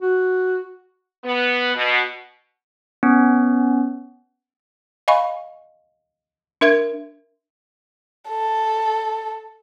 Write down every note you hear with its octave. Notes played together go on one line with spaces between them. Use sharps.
F#4
B3
B2
B3 C#4
D#5 F5 G#5 B5 C#6
D4 A#4 E5 G#6
A4